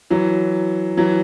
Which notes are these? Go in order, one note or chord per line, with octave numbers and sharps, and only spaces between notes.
E3 F#3
E3 F#3